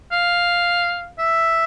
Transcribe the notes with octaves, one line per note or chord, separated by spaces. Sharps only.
F5
E5